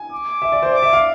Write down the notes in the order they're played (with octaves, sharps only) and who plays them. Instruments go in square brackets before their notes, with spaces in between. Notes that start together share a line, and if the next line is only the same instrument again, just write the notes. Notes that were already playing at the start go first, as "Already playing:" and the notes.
Already playing: [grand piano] G#5
[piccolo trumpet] D6
[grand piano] E5
D5
C5
[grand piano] D5 [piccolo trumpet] D6
[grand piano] E5
F5